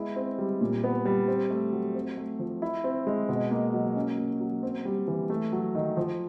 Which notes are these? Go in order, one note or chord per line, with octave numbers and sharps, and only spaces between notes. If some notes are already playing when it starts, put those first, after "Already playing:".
Already playing: G#3 B3 E4
C4
G3
A#2
B3
G3
C4
A3
F#3
C4
A3
F3
E4
C4
G#3
B2
A#3
F#3
C#4
A#3
F#3
C4
G3
E3
A3
F#3
D#3
F3